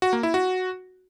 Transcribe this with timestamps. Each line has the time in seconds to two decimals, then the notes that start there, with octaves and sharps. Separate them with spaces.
0.02 F#4
0.13 A#3
0.23 E4
0.34 F#4